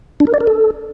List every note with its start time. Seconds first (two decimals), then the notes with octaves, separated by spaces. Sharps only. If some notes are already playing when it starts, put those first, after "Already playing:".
0.20 D4
0.27 A#4
0.34 D5
0.41 A#4
0.47 A4